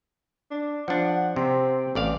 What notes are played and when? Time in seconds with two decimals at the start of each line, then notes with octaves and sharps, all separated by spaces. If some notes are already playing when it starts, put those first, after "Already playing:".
0.51 D4
0.88 F3 D4 F#5
1.07 F#5
1.36 C3 C4
1.95 A1 D5 F5